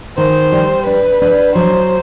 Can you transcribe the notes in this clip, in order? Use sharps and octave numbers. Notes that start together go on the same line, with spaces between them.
D#3 C5
G3
D4 B4
D4
F#3 C5